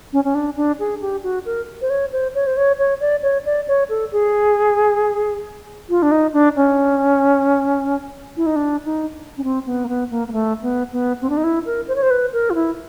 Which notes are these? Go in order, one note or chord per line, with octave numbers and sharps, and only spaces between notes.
C#4
C#4
D4
D4
G#4
G4
F#4
A#4
C5
C#5
C5
C#5
C5
C#5
C#5
D5
C#5
D5
C#5
A4
G#4
F4
D4
D#4
D4
C#4
E4
D#4
D4
D#4
C#4
C4
B3
A#3
B3
A#3
A#3
A3
B3
B3
C4
D4
D#4
E4
A#4
C5
C#5
C5
B4
A#4
F4
E4